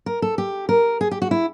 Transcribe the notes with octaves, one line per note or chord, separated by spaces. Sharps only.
A#4
A4
G4
A#4
G#4
G4
F#4
E4